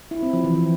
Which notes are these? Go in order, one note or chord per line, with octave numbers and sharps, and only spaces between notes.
E4
C4
F3
E3
F3